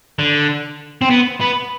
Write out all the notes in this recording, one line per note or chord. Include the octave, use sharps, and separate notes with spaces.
D3
C4
B3
B3